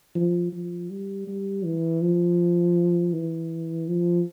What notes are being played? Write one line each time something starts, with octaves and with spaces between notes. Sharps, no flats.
F3
F3
G3
G3
E3
F3
E3
F3